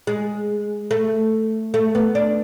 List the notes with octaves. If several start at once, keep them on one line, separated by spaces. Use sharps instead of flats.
G#3
A3
A3
B3
D4